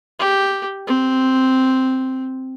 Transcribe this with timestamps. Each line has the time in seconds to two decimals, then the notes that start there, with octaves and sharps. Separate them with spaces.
0.19 G4
0.87 C4